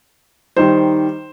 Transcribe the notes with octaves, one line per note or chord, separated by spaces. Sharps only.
D#3 G3 D#4 C5